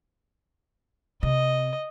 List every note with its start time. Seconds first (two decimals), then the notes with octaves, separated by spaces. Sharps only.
1.23 C3 D#5